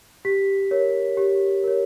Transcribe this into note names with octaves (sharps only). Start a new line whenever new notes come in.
G4 B6
A#4 C#5
G4
A#4 C#5